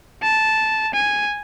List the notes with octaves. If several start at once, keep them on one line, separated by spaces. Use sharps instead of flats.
A5
G#5